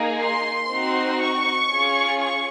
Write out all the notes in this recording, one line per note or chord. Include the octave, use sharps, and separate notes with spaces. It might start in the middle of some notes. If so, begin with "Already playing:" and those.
Already playing: A#3 D#4 G#4
C6
C4 D#4 F#4
C#6
C#4 F4 G#4
C#6